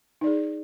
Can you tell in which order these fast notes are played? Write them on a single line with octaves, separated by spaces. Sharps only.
D#4 D5 G#4